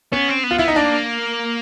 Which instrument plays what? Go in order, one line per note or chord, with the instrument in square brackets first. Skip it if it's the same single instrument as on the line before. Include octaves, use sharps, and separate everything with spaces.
[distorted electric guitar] B3 [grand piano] C#4
[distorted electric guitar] C4
B3
[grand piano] F4
[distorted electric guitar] B3 [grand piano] E4
[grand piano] D#4
[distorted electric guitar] A#3 [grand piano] D4